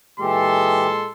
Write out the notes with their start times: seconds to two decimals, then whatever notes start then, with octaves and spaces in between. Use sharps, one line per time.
0.20 A#2 E3 G#3 G4 A4 C6